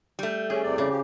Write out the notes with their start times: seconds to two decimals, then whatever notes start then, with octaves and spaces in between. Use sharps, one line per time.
0.19 G3 A3
0.50 C#4 G#4
0.63 E2 C3 D5
0.78 C#3
0.90 F3 G4